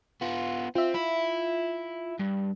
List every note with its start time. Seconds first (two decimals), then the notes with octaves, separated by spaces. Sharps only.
0.21 B3 F4
0.75 C4 F4 E5
0.94 E4
2.19 G2